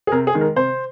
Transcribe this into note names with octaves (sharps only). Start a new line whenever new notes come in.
G#4
C3 A#4
G#4
D#3 G#3
A#4
C3 C5